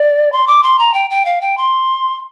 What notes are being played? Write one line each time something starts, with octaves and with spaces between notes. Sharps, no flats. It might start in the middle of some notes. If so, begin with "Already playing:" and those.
Already playing: D5
C6
D6
C6
A#5
G5
G5
F5
G5
C6